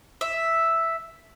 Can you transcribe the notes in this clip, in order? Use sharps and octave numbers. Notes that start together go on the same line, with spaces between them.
E5